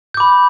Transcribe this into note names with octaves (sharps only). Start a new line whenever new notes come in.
B5 D6 G6